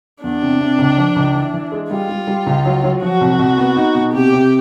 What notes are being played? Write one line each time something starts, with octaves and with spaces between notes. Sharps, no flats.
E2 D4
C3
C3
C#2
F3
C#2
E3
E3
G#3
G3 F4
G3
G3
C#2
F#3
F#3
F3 F#4
C2
C2
B3
D#4
B2
C3 G4
C3